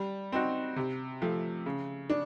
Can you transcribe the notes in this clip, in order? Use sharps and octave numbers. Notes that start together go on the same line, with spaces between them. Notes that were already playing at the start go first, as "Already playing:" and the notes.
Already playing: G3
C4 D#4 F#4
C3
F3 A3
C#3
D4